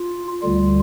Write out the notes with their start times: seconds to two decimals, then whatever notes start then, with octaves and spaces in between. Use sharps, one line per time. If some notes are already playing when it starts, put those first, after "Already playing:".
Already playing: F4
0.43 D2 D3 G3 F4